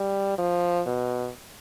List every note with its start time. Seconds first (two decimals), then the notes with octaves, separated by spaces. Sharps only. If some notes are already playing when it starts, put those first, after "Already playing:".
Already playing: G3
0.38 F3
0.86 B2